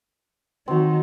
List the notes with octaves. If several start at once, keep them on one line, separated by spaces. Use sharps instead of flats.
D#3 F#3 C4